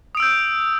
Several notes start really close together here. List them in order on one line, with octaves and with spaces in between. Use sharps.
D#6 D7 E6 G6